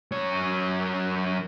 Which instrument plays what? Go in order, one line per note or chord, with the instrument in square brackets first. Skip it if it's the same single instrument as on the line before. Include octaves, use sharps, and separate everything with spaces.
[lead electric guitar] F#2 C#5